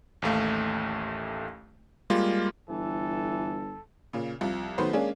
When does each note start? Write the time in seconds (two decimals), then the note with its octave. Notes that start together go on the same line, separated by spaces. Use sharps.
0.22 A1 D#2 A3 F5
2.10 G3 G#3 A#3 F4
2.70 G1 E3 A4
4.13 A#2 C#3
4.41 C2 F3
4.78 D#3 F#3 A3 B3 B4 C5
4.93 G#3 A#3 C#4 D4 G#4